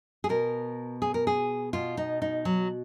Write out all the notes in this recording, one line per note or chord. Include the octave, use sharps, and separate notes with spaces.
G#4
B2 A#4
G#4
A#4
G#4
B2 F4
D#4
D#4
F#3